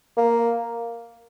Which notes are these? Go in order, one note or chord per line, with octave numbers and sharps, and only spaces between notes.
A#3